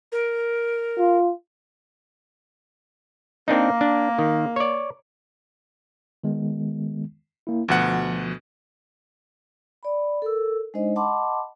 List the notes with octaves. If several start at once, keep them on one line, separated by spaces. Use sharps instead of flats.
A#4
F4
A#3 C4 D4 D#4
D4
D#3
C#5 D5
D#3 G#3 B3
A#3 E4
D2 B2 F3 F#5
D5 B5
A4 A#4 E6
G#3 D4 D#4 C5 D#5
D#5 F#5 A5 B5 C6 D6